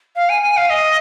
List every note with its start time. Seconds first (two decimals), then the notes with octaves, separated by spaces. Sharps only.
0.16 F5
0.29 G#5
0.43 G#5
0.57 F5
0.70 D#5